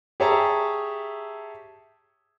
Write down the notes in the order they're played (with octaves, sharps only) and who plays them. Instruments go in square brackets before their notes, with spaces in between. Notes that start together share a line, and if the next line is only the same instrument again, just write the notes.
[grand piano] G4 G#4 C#5 E5 A5 A#5